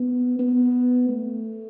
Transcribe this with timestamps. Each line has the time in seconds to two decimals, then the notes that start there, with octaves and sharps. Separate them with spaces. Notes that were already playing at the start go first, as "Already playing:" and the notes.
Already playing: B3
0.39 B3
1.09 A3